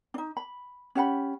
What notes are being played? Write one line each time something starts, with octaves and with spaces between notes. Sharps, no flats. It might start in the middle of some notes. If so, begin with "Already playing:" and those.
D4 D#4
B5
C#4 G4 F#5 B5